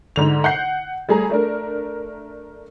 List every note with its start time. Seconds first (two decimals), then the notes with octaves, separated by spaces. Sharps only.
0.16 G#2 D3 F7
0.44 F#5 G6 C7
1.09 G3 A3 G#4 A#5
1.30 A3 D4 A#4